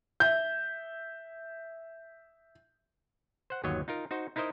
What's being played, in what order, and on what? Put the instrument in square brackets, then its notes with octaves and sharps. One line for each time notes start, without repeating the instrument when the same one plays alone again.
[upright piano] E5 G6
[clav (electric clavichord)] C5 F#5
G1 D#2 F#3 C#5 D#5
D#4 F4 A#4
D#4 F#4 C5
D#4 E4 A#4 C5 D#5